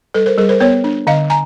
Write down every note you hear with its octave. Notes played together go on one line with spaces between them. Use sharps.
G3 A4 B4
A#4 C5
G3 G#4 A#4
A#4 C5
B3 B4 C#5
D4
D3 D#5 F5
G#5 A#5